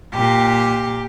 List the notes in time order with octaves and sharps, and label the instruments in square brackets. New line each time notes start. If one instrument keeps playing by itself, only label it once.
[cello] A#2 G4